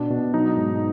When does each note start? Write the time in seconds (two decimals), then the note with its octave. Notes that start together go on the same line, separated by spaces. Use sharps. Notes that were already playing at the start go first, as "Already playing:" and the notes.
Already playing: B2 D4
0.10 B2
0.34 F#3 D#4
0.56 G#2